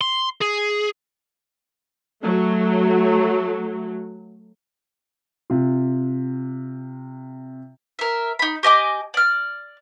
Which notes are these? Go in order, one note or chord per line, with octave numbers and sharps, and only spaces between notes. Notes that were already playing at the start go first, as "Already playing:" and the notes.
C6
G#4
F#3 A3
C3 F4
A#4 E5
D#4 B5
G4 D#5 G#5 D6
D5 F6